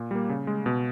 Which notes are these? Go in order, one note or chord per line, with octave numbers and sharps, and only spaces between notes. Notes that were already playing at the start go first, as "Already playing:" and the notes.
Already playing: A#2
G3 A#3
C#3
G#3
B2